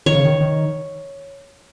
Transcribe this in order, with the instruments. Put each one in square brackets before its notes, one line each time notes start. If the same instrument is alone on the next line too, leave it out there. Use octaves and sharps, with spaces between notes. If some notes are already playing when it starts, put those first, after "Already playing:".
[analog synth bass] D#3 [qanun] C#5
[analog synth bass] C#3
D#3
D#3